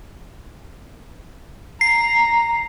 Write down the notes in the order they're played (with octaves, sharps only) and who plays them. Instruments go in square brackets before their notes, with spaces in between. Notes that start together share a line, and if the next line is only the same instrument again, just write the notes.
[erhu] A#5 [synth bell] C7